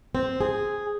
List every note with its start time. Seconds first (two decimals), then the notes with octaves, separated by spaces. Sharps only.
0.15 C4
0.41 G#4